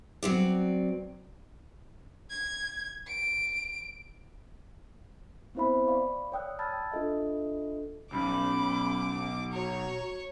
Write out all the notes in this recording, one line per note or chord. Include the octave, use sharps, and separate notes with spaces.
F#3 C4 D5
G#6
D7
B3 C4 E4 C5 E5 B5
D5 F5 B5 C#6
C#5 D5 G5 D#6 E6 F#6
A5 B5 E6 F6 G#6 A6
D4 F4 A4 D#5 E5
B1 C#4 B5 D6
F#4 C#5 A#5